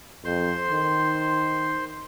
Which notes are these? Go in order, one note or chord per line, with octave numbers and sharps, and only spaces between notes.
F2 C5 C6
D#3